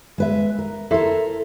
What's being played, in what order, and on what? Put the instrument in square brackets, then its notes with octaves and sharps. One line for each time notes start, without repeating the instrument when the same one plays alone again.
[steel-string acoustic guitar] G#3 B4 E5
A#4
[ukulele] E4 C5 [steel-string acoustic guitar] A4 A#4